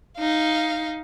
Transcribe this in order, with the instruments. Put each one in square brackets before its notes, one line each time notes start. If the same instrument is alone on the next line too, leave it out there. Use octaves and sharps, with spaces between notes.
[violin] D#4 F5